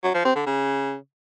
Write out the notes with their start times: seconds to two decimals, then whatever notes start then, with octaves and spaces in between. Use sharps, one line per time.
0.04 F#3
0.14 F3
0.25 C4
0.35 D3
0.46 C#3